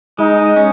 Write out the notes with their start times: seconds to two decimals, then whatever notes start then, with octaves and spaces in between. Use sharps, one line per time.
0.19 G#3 D#4
0.56 C#4